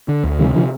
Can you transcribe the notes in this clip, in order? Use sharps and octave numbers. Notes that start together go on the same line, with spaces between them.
D3
D2
C3 D#3 G3
D3 F3